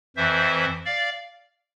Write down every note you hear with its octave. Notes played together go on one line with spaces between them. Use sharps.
F2 E3 C5 E5
D5 F5